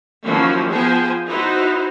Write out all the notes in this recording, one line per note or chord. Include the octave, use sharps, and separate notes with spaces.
D#3 F3 F#3 A#3 C#4 E4
F3 B3 G#4 C5 G5 G#5
D#4 E4 F#4 B4 C5